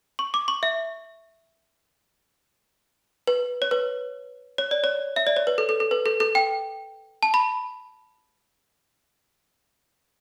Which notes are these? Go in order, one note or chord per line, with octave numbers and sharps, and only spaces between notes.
C#6
D6
C#6
E5
B4
C#5
B4
C#5
D5
C#5
E5
D5
C#5
B4
A4
A4
A4
B4
A4
A4
G5
A5
B5